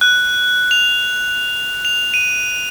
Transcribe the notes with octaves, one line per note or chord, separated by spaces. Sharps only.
F#6
F7
F7
D#7